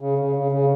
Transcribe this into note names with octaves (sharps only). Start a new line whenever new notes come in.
C#3
C#3
C#3
C#3